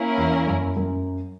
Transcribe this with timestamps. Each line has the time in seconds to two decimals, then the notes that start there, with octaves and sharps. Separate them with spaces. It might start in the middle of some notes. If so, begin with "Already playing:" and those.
Already playing: A#3 C#4 E4 A#4
0.18 E2
0.47 F#2
0.77 F#2